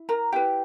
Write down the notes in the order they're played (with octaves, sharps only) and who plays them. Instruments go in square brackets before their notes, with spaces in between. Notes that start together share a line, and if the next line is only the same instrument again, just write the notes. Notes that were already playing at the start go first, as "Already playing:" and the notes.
Already playing: [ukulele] E4
A#4 A#5
E4 G4 B4 G5